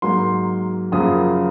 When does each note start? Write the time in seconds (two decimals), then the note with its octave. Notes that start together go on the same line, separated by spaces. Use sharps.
0.02 G#2 F#3 A#3 C6
0.92 F#2 C#3 F3 A#3 D#6